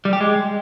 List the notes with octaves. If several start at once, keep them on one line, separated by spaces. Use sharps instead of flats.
G3
G4
G#3